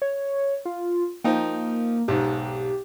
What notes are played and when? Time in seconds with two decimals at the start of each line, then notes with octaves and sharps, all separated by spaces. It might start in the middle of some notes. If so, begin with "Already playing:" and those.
0.02 C#5
0.65 F4
1.24 F3 A#3 D#4 G5
2.08 B1 G#2 G4